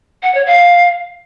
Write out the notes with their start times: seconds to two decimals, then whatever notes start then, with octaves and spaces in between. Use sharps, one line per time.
0.23 F#5
0.34 C#5
0.46 F5